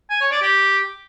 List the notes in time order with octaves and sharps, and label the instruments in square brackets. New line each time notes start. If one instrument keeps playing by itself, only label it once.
[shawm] G#5
C#5
D5
G4